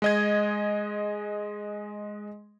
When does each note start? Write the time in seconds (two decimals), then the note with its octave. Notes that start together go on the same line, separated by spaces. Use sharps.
0.02 G#3 D#5 G#6